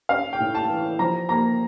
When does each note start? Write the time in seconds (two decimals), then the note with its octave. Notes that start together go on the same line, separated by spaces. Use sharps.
0.09 C#4 F5
0.33 G5
0.40 A2
0.55 A5
0.70 E3
0.99 F3 A#5
1.29 A#3 A#5